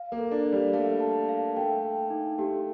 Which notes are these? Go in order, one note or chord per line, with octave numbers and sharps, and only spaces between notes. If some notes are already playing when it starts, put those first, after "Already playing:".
Already playing: F5
A#3
A4
D4
D5
G3
A3 F5
A5
F5
A3 G5
G5
D#4
A3 G4